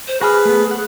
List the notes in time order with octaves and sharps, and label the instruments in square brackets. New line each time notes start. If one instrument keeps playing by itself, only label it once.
[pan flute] C5
[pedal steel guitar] F#4 G#5 F6 [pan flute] G#4 [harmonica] B4
[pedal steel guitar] A3 B3
F#5